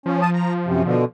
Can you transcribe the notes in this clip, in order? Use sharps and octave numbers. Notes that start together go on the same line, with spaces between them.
F3 C#4
A5 D#6
A#5
F#2 C3
B2 D3